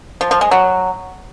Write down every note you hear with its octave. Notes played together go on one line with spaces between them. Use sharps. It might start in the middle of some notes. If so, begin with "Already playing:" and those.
F3
F3
G#3
F#3